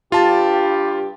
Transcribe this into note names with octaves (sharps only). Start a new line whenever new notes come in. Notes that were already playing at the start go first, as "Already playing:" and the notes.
G2 F4 G4 A5